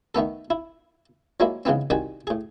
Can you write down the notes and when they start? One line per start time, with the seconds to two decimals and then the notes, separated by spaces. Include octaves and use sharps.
0.15 D#3 A3 B3 A4
0.50 E4
1.40 F3 F#3 G#3 A#3 E4
1.65 G#2 C#3 E3 B3 C4
1.90 C2 D#3 G3 F#4 G5 G#5
2.27 A2 G#4